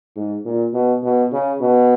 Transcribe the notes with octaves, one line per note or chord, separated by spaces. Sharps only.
G#2
A#2
B2
B2
C#3
B2